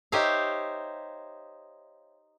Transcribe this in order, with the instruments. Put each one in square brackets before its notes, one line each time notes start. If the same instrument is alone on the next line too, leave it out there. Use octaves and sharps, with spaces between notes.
[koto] D#4 G4 C5 C#5 E5 F5